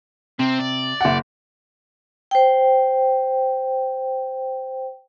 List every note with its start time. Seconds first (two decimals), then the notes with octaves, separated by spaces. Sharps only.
0.39 C3 C4
0.59 D5
1.01 F#1 F#5
2.31 C5 G5